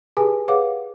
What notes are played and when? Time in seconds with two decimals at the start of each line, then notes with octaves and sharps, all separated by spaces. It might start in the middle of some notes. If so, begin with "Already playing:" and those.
0.17 G4 G#4 B4 G#5 A5
0.48 G#4 B4 C#5 F5 F#5 D6